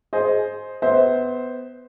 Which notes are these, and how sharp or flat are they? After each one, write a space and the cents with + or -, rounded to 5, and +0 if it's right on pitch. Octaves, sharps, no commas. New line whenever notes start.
G#4 +20 C5 +0 D#5 +0
B3 +15 C5 +0 E5 -35